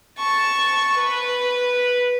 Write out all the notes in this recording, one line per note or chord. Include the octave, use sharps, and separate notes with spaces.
A5 C#6
B4